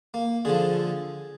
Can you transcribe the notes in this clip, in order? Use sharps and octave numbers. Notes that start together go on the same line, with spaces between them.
A#3
D3 F3 G#4